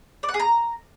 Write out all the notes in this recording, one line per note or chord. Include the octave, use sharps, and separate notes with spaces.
D5
F#5
G#4
A#5